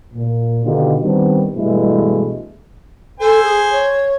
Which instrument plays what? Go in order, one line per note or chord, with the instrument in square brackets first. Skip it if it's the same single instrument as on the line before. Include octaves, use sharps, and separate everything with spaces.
[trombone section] A#2
B2 D3 D#3 D#4 F4 G4
D#3 G3 B3 C4 D4
G2 B2 E3 G#3 A3 E4
[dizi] A4 [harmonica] C5 G#5
[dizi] G#4
C#5